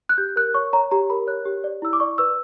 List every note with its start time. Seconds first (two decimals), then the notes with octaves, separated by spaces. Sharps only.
0.09 F#6
0.18 G4 G6
0.36 A#4 F#6
0.54 C#5 C#6
0.73 C#5 A#5
0.91 G4 A#5
1.10 A#4 B5
1.27 C#5 F#6
1.45 G4
1.64 D5
1.82 E4 E6
1.93 D6
2.00 D5 C#6
2.18 B4 E6